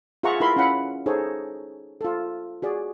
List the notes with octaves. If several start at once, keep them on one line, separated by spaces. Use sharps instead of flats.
F4 G#4 E5 F#5 A#5 C#6
E4 F4 A#4 B5 C6
C#4 E4 F5 F#5 B5
D#4 G#4 A4 C5 C#5
F4 A4
F#4 G#4 D5